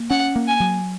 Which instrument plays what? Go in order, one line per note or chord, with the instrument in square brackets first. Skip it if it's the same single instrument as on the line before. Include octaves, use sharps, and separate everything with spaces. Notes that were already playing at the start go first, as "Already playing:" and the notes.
Already playing: [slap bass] A#3
[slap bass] C#4 [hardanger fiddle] F#5
[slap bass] A#3
[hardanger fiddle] G#5
[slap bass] F#3